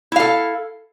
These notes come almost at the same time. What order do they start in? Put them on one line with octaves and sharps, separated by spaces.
E4 F5 A4